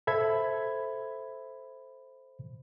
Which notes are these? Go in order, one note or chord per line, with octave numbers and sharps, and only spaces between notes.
A4 C5 E5 B5 G#6